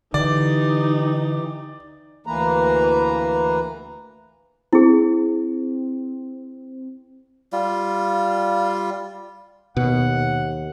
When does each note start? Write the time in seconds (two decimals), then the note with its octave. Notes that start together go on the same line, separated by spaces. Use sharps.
0.14 D3 E3 D#4 G4 D5
2.26 D2 E3 A#3 B4 A#5
4.73 C4 E4 G#4
7.52 G3 F4
9.77 D#2 B2 F#5